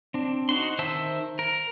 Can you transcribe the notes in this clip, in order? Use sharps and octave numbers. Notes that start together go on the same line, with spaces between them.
C4 D4
D#4 F#4 C6
D#3 C5 E5 A5 E6
A#4